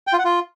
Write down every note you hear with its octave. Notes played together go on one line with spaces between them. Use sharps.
G5
F4
F#5
F4